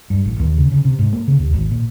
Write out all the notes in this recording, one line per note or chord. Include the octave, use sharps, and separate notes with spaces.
G2
A1
D#2
C#3
C#3
C3
G#2
A#3
C#3
D#2
G#1
A#2